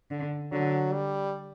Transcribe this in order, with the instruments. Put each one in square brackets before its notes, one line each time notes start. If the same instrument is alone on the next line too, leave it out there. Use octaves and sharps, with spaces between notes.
[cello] D3
[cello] D3 [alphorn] F#3
[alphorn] G3